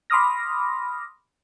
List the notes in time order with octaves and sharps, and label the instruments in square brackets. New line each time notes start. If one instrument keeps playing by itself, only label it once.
[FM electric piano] B5 C6 D6 D#6 F6 A#6